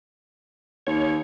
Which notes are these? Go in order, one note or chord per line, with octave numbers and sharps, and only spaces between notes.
D#2 C#5